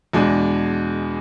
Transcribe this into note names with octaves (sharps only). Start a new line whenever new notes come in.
E2 B2 G#3 D4